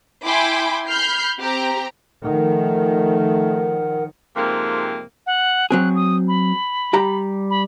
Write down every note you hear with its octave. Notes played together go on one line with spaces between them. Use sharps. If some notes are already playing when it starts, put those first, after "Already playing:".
E4 G5 G#5 B5 C6 D6
B5 F6 G6 C7
C4 G4 A#5
D#3 F3 A3 A#4 F#5
F2 G#2 C3 A#3
F#5
F#3 C4 G#4 F#6
D#6
B5
G3 G4 A#5
B5